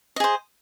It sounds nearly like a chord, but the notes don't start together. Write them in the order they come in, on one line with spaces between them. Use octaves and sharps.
D#5 G#4 C5